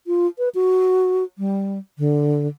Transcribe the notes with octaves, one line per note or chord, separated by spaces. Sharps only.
F4
B4
F#4
G3
D3